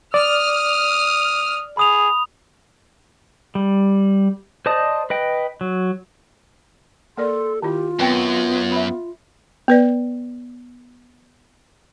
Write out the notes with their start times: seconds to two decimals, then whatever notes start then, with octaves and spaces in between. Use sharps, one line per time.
0.14 D5 D#6 F6
1.77 G#4 B5 D#6 F7
3.55 G3
4.66 C5 D5 D#5 A5 D#6
5.10 B4 D#5 G5
5.61 F#3
7.17 A#3 A4 A#4 D5 C6
7.62 D#3 E4 F4 G4
7.99 F#2 B3 C4 B4 G5
8.72 E5 B5
9.68 B3 B4 D5